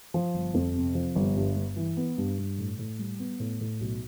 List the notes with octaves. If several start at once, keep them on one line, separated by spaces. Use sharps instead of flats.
F3
G1
F2
C3
F3
G1
G2
G2
E3
B3
G2
G2
A2
A2
G3
B3
A2
A2
B1